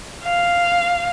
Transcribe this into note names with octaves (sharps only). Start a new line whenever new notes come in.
F5